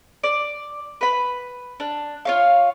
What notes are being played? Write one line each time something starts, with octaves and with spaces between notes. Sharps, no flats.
D5
B4 B5
D4
F4 C#5 F5